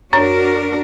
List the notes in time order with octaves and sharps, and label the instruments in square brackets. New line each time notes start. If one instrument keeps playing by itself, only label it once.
[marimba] F#2 C#5 C#6 [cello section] D4 F#4 A#4